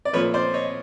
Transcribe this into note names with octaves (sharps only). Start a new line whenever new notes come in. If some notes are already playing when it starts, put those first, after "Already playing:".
D5
A#2 F3 A3 B4 C#5
C5 D5
C#5 D#5